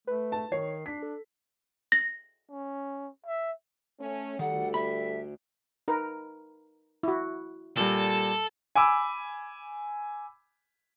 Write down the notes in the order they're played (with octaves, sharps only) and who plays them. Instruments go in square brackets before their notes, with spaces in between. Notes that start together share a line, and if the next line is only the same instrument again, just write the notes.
[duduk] A3 [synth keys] B4
[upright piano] A5
[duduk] D#3 [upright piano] C#5 [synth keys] C7
[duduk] D4 [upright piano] B6
[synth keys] A4
[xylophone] A#6
[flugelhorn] C#4
E5
[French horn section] A3 C#4
[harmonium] D2 [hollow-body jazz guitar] D#3 [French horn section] G3 A4 [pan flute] F#5
[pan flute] E5 [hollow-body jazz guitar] B5
[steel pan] D#4 A#4 B4
E4 F#4
[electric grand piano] A#2 G3 [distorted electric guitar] A4
[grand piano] G#5 B5 D6 E6